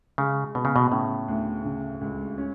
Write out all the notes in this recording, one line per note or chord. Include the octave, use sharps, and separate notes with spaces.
C#3 G#3
B2 B3
C#3
B2
A2 C#3
D2
C#3
C#2
C#4